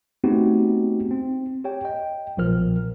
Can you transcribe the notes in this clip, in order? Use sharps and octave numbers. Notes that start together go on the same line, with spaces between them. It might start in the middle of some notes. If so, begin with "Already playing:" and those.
A3 B3 C4 D#4 F#4 G4
C4
G4 C#5 G5
D#5 G5
B1 A#2 F3 A#4 F6